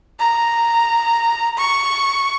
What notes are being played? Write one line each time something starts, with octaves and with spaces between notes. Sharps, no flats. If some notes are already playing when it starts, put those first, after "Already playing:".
A#5
C#6